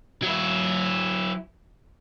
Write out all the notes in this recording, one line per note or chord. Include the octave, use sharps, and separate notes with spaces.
F#3 E4